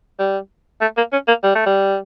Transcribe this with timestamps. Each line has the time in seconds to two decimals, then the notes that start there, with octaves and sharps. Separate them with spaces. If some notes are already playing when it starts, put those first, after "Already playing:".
0.19 G3
0.81 A3
0.97 A#3
1.12 C#4
1.28 A#3
1.44 G3
1.55 A3
1.66 G3